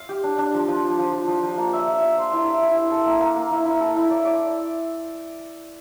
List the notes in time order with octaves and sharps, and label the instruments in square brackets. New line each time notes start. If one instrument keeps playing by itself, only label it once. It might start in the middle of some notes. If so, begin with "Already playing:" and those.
Already playing: [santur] F5
G4
D4
D4
F3
F3
F3
F3
F3
F3
F3
A#3
E5
E5
E5
C5
E4
E5
E4
E5
A4
A#3
A#3
A#3
E4
E4
A4
E4
D5
D5